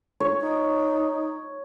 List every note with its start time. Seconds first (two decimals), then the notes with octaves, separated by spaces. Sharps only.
0.20 C#5
0.40 D#4